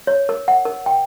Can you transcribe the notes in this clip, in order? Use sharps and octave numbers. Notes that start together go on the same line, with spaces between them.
C#5
A#4
F#5
A#4
G5